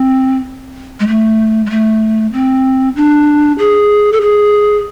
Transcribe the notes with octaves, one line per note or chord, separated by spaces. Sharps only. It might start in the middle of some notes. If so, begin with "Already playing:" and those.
Already playing: C4
G#3
A3
G#3
A3
C4
D4
G#4
A4
G#4